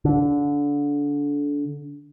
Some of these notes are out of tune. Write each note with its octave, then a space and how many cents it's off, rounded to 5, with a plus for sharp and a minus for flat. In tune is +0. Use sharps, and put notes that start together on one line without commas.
D3 -25